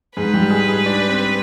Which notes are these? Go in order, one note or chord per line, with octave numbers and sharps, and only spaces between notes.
G#2 G#3 B4
G3 G4
G#3 G#4
G#3 G#4
D4 D5
C4 C5